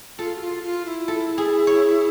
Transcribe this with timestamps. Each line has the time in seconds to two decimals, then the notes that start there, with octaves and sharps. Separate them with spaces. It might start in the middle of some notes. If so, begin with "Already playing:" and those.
0.18 F4 A4
0.36 F#4
0.41 F4
0.63 F4
0.86 E4
1.08 A4
1.38 G#4
1.67 C#5